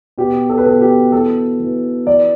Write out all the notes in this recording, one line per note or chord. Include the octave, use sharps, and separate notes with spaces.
B2 G4
A4
B4
B2 A4
G4
E3 A4
E3
E3 D5